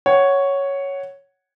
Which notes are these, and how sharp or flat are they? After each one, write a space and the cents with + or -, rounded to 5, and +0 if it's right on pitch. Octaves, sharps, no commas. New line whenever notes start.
C#5 +0 F#5 +5